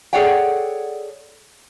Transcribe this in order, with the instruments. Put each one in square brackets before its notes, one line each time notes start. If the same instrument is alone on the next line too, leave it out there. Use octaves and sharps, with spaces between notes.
[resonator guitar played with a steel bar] G#4 A4 C#5 D5 F#5 G5